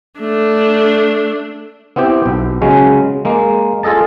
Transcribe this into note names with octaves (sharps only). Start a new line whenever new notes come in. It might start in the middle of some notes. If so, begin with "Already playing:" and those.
A3 D4
B3 C4 E4 G4 G5
B1
C#3 F#3 G#3 C#4
G#3 A#3
F4 G#4 A4 D#5 A5